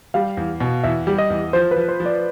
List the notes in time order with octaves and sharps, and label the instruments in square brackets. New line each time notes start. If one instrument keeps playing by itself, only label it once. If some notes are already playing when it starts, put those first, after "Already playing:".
[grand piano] G3 [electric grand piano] F5
[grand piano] E2
B2
[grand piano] E2 [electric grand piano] E5
[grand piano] G3
[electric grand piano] D#5
[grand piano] E2
[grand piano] F3 [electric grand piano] C5
[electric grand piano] B4
[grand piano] F3
[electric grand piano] C5
[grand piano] F3
[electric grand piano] D5